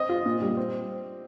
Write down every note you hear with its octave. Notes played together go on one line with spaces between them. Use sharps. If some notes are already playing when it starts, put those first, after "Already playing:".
Already playing: C4 D#5
F4
A#2
G3
C4